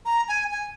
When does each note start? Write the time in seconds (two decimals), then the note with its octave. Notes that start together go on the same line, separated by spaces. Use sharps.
0.05 A#5
0.28 G#5
0.52 G#5